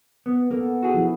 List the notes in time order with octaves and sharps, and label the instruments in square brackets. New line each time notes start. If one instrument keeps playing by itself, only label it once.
[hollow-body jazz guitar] B3
[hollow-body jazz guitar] A#3 [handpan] B3 A4
[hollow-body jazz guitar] F#4 G#4
[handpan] F3 E4